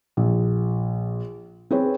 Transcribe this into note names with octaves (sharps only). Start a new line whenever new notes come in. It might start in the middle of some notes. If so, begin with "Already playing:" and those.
A#1
C4 G#4 B4 C#5